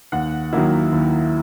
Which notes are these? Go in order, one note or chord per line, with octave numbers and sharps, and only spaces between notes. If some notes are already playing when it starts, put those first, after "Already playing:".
D#2 F#5
D#3 F#3 A#3 E4
D#2